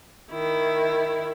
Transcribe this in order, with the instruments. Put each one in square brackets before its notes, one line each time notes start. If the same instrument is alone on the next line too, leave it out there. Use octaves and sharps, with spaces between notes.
[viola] D#3 E4